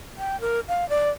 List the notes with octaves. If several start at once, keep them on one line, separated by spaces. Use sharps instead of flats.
G5
A#4
F5
D5